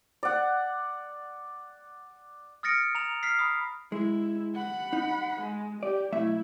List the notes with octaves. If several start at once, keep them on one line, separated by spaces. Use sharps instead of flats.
D5 F#5
D#6 F6 A6 A#6 C#7 D7
A#5 F7
F6 B6 C7
B5 D#6
G#3 E4
F#5 B5
D#4
G#3
G4 D5
B1 A3 E4 E5